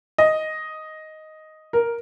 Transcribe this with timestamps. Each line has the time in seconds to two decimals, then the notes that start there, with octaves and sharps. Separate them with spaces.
0.18 D#5
1.73 A#4